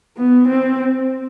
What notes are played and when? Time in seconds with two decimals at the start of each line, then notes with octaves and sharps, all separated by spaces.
0.18 B3
0.48 C4